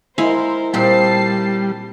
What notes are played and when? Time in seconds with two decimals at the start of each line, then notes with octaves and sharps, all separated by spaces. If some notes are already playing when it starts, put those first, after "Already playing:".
0.18 G#3 E4 A#4 C5 F5
0.74 A#2 G3 C4 G4 A5 C7